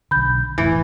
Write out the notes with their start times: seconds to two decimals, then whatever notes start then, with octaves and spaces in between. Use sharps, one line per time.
0.11 B1 D3 B5 G6
0.58 F1 A2 E3